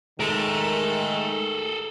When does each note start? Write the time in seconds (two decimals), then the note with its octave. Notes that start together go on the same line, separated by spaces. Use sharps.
0.20 D#3 G#3 A3 A4 A#4